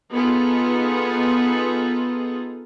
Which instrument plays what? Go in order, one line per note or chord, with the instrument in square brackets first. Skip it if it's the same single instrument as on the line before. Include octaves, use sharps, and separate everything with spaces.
[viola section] B3 D#4 F4 G#4 A4